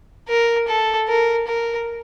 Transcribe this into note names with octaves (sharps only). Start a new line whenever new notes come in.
A#4
A4
A#4
A#4